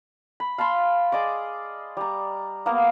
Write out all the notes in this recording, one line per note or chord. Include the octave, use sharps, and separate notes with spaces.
B5
F5 A5 B5 C6
G#4 D5 D#5 D6
G3 A#5
A#3 B3 A#4 F5